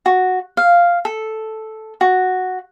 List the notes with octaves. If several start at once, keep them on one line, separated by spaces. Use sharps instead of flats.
F#4
F5
A4
F#4